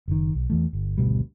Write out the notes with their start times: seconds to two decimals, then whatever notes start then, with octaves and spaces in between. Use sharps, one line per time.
0.08 F#1 D#3
0.35 B1
0.50 E2 E3 A3
0.73 G1
0.98 G#1 D2 B2 G3